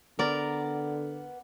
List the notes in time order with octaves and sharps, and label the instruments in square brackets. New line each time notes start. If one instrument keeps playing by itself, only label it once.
[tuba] D3 [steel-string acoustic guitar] B3 [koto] A#4 D5